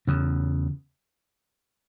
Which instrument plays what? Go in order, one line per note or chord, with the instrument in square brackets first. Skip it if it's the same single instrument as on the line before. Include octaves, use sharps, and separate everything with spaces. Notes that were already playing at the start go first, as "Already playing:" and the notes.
[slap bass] E2 C#3